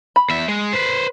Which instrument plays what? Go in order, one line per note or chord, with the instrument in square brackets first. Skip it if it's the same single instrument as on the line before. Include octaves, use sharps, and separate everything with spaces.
[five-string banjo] B5
[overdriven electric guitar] E2 E5
G#3
B4 C5